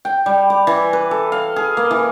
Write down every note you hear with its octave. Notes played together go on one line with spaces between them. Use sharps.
G5
G3
D6
E3
B4
A4
F5
G#4
A#3
E3